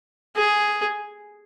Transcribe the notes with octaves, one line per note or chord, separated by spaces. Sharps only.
G#4